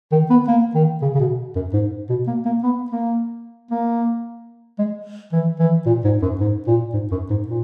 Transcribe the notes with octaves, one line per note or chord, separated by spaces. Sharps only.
D#3
B3
A#3
D#3
C#3
C#3
B2
F#2
G#2
B2
A#3
A#3
B3
A#3
A#3
G#3
E3
E3
A#2
G#2
F#2
G#2
A#2
G#2
F#2
G#2
A#2